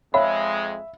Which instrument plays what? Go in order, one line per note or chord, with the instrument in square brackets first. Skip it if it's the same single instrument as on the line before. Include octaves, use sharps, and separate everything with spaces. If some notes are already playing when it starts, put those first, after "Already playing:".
[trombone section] F2 G#3 [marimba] C#5 [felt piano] E5 [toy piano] F5 B5